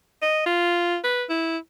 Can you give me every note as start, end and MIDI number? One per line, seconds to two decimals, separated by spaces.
0.22 0.45 75
0.46 0.98 65
1.04 1.25 71
1.30 1.57 64